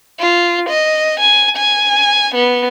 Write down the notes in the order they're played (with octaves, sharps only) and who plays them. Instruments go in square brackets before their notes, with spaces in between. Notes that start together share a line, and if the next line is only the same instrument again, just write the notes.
[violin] F4
D#5
G#5
G#5
B3